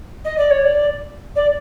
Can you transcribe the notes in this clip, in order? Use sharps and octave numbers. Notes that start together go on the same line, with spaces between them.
D#5
D5
C#5
D5
D5